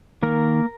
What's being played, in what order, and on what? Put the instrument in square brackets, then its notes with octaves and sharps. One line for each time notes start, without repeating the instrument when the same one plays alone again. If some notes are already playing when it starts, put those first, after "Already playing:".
[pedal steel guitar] D#3 A#3 A#4